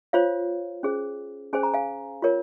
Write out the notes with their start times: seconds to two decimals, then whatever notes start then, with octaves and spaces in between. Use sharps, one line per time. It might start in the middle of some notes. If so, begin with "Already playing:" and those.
0.13 F4 C5 C#5 F5
0.83 C#4 G#4 C5
1.53 C#4 G#4 C5 G#5
1.63 A#5
1.74 F5 G#5
2.22 F4 A#4 C#5